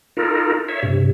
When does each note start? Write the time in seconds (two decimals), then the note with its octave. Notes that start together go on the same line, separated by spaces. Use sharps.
0.17 D#4 F4 A4 A#4
0.69 C#5 E5
0.83 G2 C3